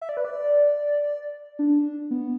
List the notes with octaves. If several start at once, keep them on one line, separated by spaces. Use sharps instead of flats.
E5
D5
B4
D5
D4
B3